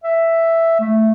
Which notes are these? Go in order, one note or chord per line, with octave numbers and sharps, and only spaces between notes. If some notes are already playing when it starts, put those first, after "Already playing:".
E5
A3